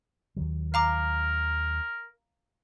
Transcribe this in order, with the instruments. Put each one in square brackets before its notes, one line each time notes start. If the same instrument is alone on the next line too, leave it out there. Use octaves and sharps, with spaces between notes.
[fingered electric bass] D#2 D#3 F#3
[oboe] A#4 [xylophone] F5 A#5 D6